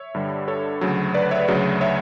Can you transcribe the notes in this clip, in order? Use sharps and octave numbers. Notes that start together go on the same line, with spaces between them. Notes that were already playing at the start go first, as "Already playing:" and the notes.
Already playing: C#5 E5
G2 D3 G3
A4 C#5
D2 C#3 F#3
B4 D5
C#5 E5
D2 C#3 F#3
C#5 E5